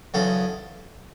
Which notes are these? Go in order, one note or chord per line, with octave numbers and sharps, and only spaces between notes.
E2 C#3 F#3 A4